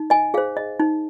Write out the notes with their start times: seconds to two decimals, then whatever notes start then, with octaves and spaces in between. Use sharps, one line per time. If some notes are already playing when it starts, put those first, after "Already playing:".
Already playing: D#4
0.10 D#5 G#5
0.34 G#4 C5 F5
0.57 D#5
0.80 D#4